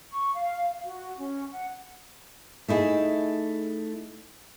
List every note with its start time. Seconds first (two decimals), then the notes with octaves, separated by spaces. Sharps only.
0.12 C#6
0.35 F5
0.85 F#4
1.18 C#4
1.52 F#5
2.68 A3 D#4 E4 G#4